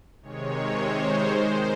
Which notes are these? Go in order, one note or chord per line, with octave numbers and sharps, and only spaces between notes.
C3 D#3 G#3 C#5
C5
D#3 G#3